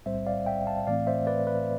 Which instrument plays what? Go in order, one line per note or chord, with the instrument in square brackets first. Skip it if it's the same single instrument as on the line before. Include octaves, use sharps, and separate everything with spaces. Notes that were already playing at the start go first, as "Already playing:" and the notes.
[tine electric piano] B1 A2 G3 C4 C5 E5
D5 F5
E5 G5
F5 A5
A2 E3 A3 C4 D5 F5
C5 E5
B4 D5
B4